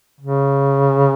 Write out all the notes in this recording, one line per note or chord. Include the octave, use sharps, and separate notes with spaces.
C#3